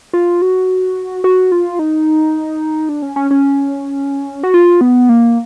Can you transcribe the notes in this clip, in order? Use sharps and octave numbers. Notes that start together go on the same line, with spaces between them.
F4
F#4
F#4
F4
D#4
D4
C#4
C#4
C#4
F#4
F4
B3
A#3